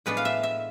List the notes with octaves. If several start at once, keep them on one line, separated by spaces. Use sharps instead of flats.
A2 G#3 B3 D4 B4
F5
E5
E5